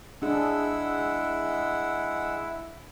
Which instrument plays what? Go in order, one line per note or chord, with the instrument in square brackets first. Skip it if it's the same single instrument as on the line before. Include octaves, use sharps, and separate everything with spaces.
[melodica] G#3 F#5 E6 [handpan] D4 G#4 [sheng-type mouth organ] E4